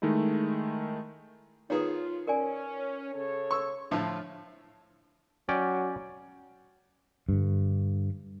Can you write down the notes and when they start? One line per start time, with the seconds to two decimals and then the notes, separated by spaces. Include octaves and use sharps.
0.02 D#3 G#3 A3 D#4 E4
1.70 D#3 B3 F4 G#4 C#5 A#5
2.27 C#4 A#4 D5 G#5
3.14 C#3 A4 C#5
3.51 C#6 E6
3.91 A2 D3 F3 F4
5.49 F#3 C#4 D5 G5
7.29 G2 D3